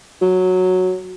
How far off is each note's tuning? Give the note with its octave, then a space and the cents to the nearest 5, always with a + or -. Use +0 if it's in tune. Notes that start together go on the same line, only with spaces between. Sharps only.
F#3 -5